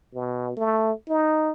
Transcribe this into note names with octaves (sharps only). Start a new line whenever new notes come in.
B2
A3
D#4